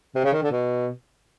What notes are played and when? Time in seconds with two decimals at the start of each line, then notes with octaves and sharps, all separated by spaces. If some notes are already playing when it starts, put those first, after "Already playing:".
0.15 C3
0.24 C#3
0.33 D#3
0.42 D3
0.51 B2